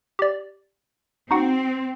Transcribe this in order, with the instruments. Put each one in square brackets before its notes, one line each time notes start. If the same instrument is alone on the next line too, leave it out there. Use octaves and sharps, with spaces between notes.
[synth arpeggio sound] G4 D5
[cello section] C4 [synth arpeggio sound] D#4 F#4 F#5